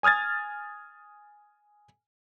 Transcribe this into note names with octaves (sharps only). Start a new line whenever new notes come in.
G#5 D#6 F6 G#6 A6